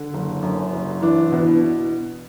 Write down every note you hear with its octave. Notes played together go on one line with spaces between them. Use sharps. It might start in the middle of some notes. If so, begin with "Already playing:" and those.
Already playing: D3
F#1
F#2
F#1
E3 D4
B2